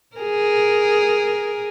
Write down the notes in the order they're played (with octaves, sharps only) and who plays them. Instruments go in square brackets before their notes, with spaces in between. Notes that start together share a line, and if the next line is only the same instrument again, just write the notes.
[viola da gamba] G#4 A#4